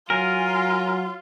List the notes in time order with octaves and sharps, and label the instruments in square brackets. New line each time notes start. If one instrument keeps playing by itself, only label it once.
[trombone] F#3 [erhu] F4 [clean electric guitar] A#4 [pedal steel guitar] G#5